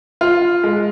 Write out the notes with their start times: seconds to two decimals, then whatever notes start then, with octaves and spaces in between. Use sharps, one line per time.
0.21 F4
0.64 G#3